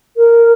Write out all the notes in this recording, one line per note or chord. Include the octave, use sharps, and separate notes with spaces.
A#4